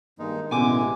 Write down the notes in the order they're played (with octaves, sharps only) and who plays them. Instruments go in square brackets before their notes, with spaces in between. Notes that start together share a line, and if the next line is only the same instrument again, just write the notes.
[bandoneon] G2 G#3 D#4 [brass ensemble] D#3 A#3
[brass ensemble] A1 [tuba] B2 [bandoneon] D3 E3 G#3 [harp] G#5 D6